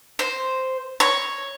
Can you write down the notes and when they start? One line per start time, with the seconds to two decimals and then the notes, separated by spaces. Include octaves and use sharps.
0.19 C5
1.00 C#5